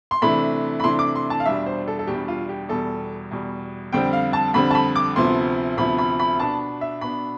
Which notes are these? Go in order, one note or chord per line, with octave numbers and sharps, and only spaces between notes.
C6
C3 E3 A3 D4 B5
B5
C3 E3 A3 D4 C6
D6
C6
A5
F5
E2 B2 G3 D4 E5
C5
A4
A4
E2 B2 G3 D4 G4
F4
G4
E2 B2 G3 A4
E2 B2 G3
F2 D3 G3 C4 G5
F5
A5
F2 D3 G3 C4 B5
A5
B5
D6
D2 C3 F3 B3 C6
D2 C3 F3 B3 B5
B5
B5
B2 B3 D4 A5
E5
B2 B3 D4 B5